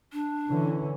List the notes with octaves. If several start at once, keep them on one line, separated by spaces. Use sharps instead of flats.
D4
D3 E3 C#4